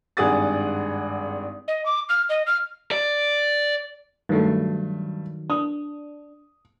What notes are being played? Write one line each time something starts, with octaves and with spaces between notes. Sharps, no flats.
G#1 G2 G#4 F#5 D#6 A6
D#5
D6
F6
D#5
F6
D5
G2 D#3 F#3 A3
D4 D#6